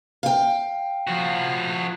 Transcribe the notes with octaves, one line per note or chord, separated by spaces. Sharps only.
F5 G5
F3 F#4